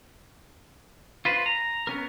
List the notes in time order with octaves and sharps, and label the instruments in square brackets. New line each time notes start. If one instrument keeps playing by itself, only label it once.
[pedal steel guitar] F4 B4 C5
A#5
B3 C#4 A#4